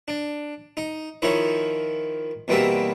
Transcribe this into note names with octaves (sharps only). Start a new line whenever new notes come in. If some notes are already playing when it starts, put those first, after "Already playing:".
D4
D#4
D#3 F3 D#4 E4 C#5
E2 B2 G3 A#3 C4 E5